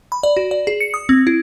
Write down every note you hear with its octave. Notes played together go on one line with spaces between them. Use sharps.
B5
D5
F#4
D5
G#4
C#7
D#6
C4
E4